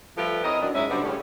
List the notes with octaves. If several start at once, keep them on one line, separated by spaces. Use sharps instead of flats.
F3 G3 A3 G4 A4 B4
C4 E4 A#4 C#5 D#5
F#2 D4
G#2 C#4 D#4 E4 E5
D3 G3 B3 F#4 C5 D5
A2 C#3 G3 C#4